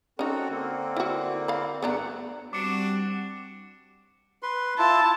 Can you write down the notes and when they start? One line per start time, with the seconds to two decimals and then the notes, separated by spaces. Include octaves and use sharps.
0.19 C4 C#4 D#4 F#4 A4
0.49 D3 A#3 C4
0.97 E4 F#4
1.48 F5 B5
1.82 G2 A3 B3 D4 F#5 A#5
2.53 G3 C4 D4 F#4 D6 C#7
4.43 B4 C6
4.78 E4 F4 A5